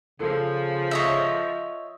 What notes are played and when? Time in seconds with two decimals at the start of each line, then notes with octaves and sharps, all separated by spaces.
0.20 C#3 F3 A4
0.91 C#5 D#5 E5